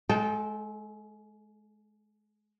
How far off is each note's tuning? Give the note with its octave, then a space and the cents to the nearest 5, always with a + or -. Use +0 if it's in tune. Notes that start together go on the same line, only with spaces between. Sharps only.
G#3 +30 A4 -15 G5 +0